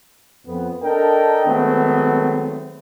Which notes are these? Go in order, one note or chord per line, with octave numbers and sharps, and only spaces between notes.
F2 B3
D4 A4 A#4 D#5 G5
D#3 F#3 G#3 A3 B3 C4